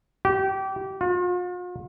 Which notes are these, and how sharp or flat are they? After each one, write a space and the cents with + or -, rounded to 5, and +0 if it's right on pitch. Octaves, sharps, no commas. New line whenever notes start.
G4 -25
F4 +45